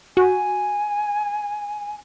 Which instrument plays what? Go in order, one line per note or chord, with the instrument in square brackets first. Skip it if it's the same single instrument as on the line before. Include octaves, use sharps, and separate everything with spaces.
[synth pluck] F#4 [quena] G#5